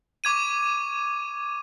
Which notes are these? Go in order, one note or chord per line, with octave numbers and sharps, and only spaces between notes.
C#6 D6 G#6 D#7